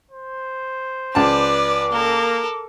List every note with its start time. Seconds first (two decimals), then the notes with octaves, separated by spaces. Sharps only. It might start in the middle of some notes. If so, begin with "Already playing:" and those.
0.11 C5
1.15 C#2 B4 D5 A5 D6
1.92 A#3 A4 A#4